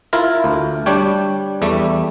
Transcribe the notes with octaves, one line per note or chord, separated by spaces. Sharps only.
E4 F4 A#4
D2
G3 D4 C#5 G5
E2 G3 A3